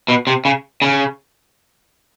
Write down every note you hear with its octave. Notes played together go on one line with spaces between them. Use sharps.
B2
C3
C#3
C#3